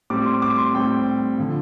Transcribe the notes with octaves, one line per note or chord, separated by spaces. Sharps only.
A2 G3 C4 D6
C6
D6
C6
A2 G3 C4 G5
D3 F3